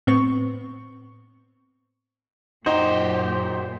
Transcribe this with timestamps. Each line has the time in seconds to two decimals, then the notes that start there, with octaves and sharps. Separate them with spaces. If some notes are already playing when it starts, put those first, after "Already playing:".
0.07 A2 B3 C4 C#6
2.66 F#2 A#2 D#4 F#4 G4 C5